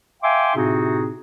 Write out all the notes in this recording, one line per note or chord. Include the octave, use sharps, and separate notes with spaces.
E5 F5 G5 G#5 C6 D6
A2 C3 C4 D#4 F#4 G#4